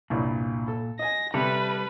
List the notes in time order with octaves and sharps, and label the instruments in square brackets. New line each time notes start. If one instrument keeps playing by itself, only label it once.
[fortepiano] C2 G2 [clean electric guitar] A#2
[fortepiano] A4
[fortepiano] D#5 G#5 [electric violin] A#6
[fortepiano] C3 [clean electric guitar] G3 A4 [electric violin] B4